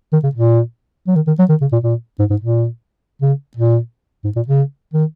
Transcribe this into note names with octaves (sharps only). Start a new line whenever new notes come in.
D#3
C#3
A#2
F#3
D#3
D#3
F#3
D#3
C#3
A#2
A#2
G#2
G#2
A#2
C#3
A#2
G#2
A#2
C#3
D#3